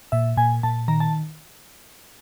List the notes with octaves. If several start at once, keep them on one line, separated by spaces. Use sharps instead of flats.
A#2 E5
A#2 G#5
A#2 A5
D#3 A#5
A5